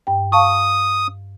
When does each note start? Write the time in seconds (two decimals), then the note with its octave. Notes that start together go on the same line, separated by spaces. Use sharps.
0.07 G2 G5
0.32 F5 A5 C#6 D#6